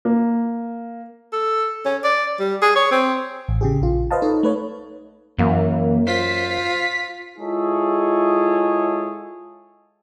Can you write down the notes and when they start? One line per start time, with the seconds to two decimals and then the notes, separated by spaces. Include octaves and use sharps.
0.05 A#3
1.33 A4
1.86 C#4
2.04 D5
2.39 G3
2.62 G#4
2.76 C#5
2.91 C4
3.48 A1
3.61 C#3 G4 G#4
3.81 A#1 F4
4.11 B4 C5 D#5 F5 A5
4.22 D#4 A4 C#5
4.43 A3 B4 C#5
5.39 F#2 E3 A#3
6.07 F4 C5 B6
7.38 G#3 E4 F4 G#4 A4 C#5